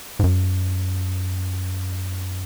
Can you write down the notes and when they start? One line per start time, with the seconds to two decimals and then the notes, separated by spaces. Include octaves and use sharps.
0.19 G#2
0.24 F#2